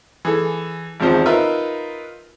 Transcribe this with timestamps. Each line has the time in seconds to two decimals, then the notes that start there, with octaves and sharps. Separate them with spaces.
0.25 E3 G#4 A4
1.00 G#1 E2 C3 F3 C5
1.26 D#4 F4 A#4 B4 E5